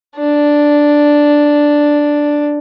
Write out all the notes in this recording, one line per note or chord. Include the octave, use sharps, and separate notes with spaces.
D4